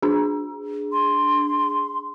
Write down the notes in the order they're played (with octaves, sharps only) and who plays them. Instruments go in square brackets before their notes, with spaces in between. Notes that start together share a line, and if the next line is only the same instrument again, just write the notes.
[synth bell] D4 G#4
[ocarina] C6